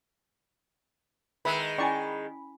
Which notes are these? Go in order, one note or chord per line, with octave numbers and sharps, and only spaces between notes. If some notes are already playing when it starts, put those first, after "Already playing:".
D#3 G#3 B4 E5 B5
C#4 E4 D5 G5 G#5 C#6